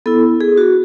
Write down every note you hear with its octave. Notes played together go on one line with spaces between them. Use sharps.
B3 E4 A4
G#4
F#4